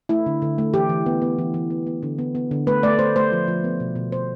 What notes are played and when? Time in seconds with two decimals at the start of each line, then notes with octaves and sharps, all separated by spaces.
0.09 A3 E4
0.26 D3
0.42 D3
0.58 A3
0.73 E3 G4
0.90 E3
1.06 B3
1.22 B3
1.39 E3
1.54 E3
1.70 B3
1.87 B3
2.03 D3
2.18 B3
2.35 B3
2.51 D3
2.67 A3 B4
2.83 A3 D5
2.99 A3 C5
3.16 A3 C5
3.32 F3
3.48 F3
3.64 B3
3.80 B2
3.95 B2
4.12 B2 C5